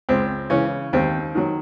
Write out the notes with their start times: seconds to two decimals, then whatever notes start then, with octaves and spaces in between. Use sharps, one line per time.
0.09 C#2 C4
0.50 C#3 E3 C#4
0.93 D#2 C4
1.35 D#3 F#3